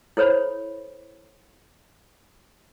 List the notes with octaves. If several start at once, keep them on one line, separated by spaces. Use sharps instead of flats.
E4 A4 C5 C#5 B5